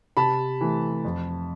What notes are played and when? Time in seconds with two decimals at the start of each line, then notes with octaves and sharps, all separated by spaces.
0.17 C3 A5 B5
0.61 E3 A3
1.05 F2